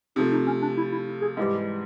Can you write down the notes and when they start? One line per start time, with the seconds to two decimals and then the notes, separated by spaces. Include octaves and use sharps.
0.16 C3 F3 A3 D#4
0.32 D#4
0.47 C#4
0.62 D4
0.77 E4
0.92 E4
1.22 G#4
1.37 G#2 E3 G3 G4